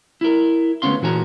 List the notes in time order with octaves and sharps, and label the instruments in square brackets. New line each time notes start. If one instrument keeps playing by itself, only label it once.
[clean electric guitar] E4 A#4
D2 G#2 B3 C#4 F5 C6
A#2 E3 F#4 G#5 A#5